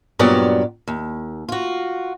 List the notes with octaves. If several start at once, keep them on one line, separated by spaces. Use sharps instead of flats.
G2 A#2 F#3 B3 G4 D5
D#2
F4 F#4